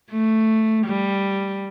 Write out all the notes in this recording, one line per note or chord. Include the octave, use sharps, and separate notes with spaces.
A3
G3